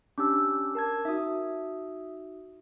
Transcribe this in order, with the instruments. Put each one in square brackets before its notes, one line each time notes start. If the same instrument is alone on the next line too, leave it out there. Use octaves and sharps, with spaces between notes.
[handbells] C#4 D4 G4 [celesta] D6 E6
[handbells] A#4 A5 G#6
[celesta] D#4 F#4 [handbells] E5 D#6